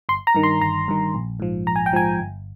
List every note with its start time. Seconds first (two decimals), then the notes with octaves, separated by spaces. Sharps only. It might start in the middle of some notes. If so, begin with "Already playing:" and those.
0.09 G1 C6
0.27 A#5
0.35 G2 D#3
0.43 C6
0.61 G1 A#5
0.88 G2 D#3
1.14 A#1
1.40 G#2 F3
1.67 A#1 A#5
1.76 G#5
1.86 G5
1.93 G#2 F3 G#5
2.19 G1